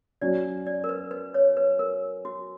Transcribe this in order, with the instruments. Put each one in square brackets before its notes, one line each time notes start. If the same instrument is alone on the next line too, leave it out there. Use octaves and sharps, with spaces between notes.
[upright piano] F#3 C#4 F#4 [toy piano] D5
[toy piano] D5
A#4
B4
B4
C#5
B4
A#4
F#4